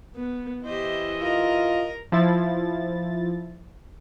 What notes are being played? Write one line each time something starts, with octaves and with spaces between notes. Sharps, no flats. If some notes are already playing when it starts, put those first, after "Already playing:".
B3
E3 E4 G4 C5 D#5
F4 A#4 A#5
F3 E4 A6